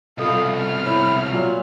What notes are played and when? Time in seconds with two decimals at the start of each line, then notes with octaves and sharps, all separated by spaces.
0.18 C2 B2 F4 A4 D#5 F5
0.57 F6
0.86 E4 C#5
1.31 A#2 F#3 F4